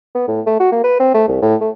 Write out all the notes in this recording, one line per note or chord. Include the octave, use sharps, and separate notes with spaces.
B3
A2
A3
F#4
A#3
B4
C4
A3
C2
A2
A3